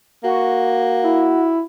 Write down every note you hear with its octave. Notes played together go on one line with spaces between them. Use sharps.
A#3 F#4
E4